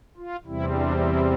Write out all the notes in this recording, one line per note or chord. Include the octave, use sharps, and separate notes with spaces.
F4
E2 C3 G3 C4 E4
D4
E4